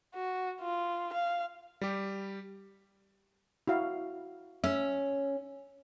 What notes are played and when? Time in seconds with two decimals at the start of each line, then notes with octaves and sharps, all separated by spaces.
0.15 F#4
0.61 F4
1.13 F5
1.81 G3 G4
3.68 E4 F#4 F5
4.64 C#4 E5